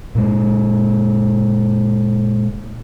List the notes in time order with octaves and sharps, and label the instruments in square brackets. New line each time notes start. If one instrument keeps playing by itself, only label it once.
[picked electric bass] A#2 G#3